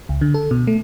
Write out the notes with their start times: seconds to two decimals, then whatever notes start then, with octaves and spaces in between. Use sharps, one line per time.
0.09 C#2
0.21 D3
0.34 A4
0.51 B2
0.67 A3